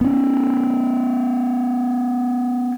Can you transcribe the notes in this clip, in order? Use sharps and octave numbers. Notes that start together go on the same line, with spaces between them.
B3 C#4